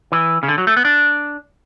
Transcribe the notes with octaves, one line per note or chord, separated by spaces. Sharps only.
E3
C#3
D3
F#3
A3
B3
D4